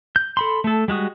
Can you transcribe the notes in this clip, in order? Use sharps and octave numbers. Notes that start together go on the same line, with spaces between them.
G6
A4 B5 C6
A3 A4
G3 G#3 F#4 D#6